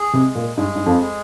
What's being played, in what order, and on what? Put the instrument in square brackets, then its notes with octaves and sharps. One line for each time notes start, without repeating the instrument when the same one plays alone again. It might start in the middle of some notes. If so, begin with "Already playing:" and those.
Already playing: [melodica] G#4
[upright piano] C3 [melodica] G#3
[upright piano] A#2
[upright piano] G2 [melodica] G#3
[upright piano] G2
F2
[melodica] G#3